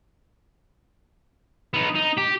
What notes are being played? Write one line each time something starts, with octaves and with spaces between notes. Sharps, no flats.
B3 D#4
D#4
G4